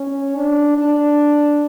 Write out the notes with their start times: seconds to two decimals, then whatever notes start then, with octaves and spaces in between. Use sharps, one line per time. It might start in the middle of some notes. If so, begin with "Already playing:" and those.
Already playing: C#4
0.36 D4
0.78 D4